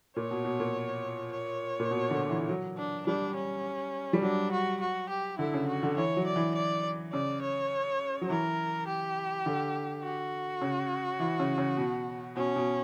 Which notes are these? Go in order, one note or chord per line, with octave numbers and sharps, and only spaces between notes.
A#2 C#5
B2
B2
A#2
C#5
A#2
B2
D3
E3
F#3
D4
G3 D4
C#4
G3
F#3 D4
F#4
F#4
G4
D3 E4
C#3
F#4
D3
E3 C#5
F#3
D5
E3
D5
C#3 D5
C#5
F#3
E3 A#4
G4
D3
F#4
C#3
E3
C#3
C#3
B2
B2 C#4
B2